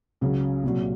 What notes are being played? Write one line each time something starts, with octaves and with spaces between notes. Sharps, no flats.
C#2 C#3 F#3
C2 A#2 F#3